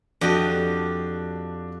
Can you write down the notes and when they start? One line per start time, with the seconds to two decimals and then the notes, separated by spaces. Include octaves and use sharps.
0.21 F2 D4 F#4 G4 D#5